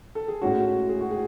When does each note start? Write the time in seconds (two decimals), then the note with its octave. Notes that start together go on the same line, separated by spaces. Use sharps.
0.15 A4
0.28 G#4
0.42 A2 G#3 C#4 F#4
0.89 G#4
1.01 F#4
1.11 G#4